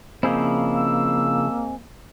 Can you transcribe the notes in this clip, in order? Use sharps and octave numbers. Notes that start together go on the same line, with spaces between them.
C#3 F3 A#3 C4 E4 G#4 D#5
E6